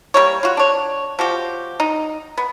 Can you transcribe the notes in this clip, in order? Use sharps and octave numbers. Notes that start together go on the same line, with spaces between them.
G3 A#3 C#5
F4 F#4
D4 C#5
F3 F#4 G4
D#4
B3